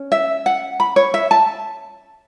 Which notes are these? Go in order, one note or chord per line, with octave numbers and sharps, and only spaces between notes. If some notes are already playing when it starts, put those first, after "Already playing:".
Already playing: C#4
E5
F#5
B5
C#5
E5
A5